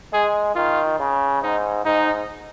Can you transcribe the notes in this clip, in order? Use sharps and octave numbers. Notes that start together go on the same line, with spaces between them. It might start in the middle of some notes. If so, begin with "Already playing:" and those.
G#3 G#4
D#3 F4
C#3
G#2 D#4
G#2 D#4